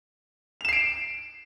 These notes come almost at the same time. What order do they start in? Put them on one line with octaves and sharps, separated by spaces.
F7 E7 C7 D7